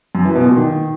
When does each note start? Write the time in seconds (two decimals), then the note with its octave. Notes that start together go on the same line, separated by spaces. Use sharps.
0.15 F#2
0.25 E3
0.35 B2
0.46 A#2
0.56 D#3